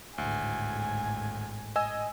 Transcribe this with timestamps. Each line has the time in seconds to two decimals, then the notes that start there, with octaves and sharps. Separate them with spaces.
0.18 G#1 D2 A2 G#5
1.76 D#5 G#5 E6